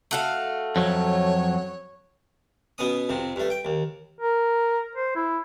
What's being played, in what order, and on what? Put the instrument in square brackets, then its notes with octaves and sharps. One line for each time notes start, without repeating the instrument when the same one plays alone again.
[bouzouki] A3 F#4 F5
[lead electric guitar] F2 F#3 [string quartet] C#5
[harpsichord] B2 B3 C#4 D#6
F2 C3
G2 A3
G5
D#2
[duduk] A#4
C5
E4